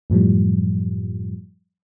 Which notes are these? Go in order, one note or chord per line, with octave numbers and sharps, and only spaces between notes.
F#2 A2 F3 G3